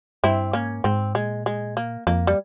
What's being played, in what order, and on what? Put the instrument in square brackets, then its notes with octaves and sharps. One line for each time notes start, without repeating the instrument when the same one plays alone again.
[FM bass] G2 [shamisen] C4 E4
[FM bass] G#2 [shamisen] A#3 C#4
[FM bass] G#2 [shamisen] C4
[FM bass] A#2 [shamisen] G#3
[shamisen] G#3
A#3
[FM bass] F2 [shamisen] A#3
[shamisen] G3